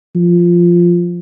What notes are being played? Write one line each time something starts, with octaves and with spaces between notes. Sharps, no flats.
F3